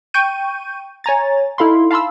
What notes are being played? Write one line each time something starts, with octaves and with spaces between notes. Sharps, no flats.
G5 C#6 G6 D#7
C#5 G#5 A#5 A6
D#4 E4 A4 F5 B5 C6
F5 A5 B5 C6 E6